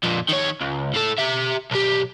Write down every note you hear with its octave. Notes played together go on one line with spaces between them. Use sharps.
F2 A#2
D#3 C#5
C#2
A2 A4
G4 E5
B1 G4